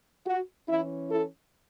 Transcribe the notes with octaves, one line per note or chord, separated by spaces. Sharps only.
F#4
E3 C#4 E4
E4 A4